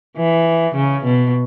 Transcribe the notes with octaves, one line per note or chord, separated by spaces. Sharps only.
E3
C#3
B2